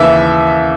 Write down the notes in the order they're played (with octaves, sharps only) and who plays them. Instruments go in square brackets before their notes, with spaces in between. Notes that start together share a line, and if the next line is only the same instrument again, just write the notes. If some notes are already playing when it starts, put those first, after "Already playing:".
Already playing: [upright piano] D#2 C#3 E3 E5